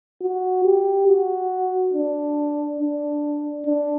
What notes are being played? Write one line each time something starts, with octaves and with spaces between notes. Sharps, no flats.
F#4
G4
F#4
D4
D4
D4